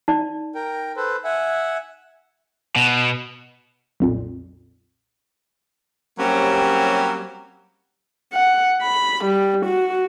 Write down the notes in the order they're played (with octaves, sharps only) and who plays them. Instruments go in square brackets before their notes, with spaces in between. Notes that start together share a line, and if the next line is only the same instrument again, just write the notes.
[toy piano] D#4 D5
[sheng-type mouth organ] A#4 G5
A4 B4 C5
E5 F#5 G#5
[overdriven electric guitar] B2
[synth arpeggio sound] B1 F2 A#2
[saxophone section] F#3 G3 A#3 C4 C#4 G4
[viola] F#5
B5
G3
F#4